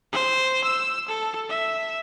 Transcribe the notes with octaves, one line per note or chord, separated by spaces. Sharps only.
C5
E6
A4
E5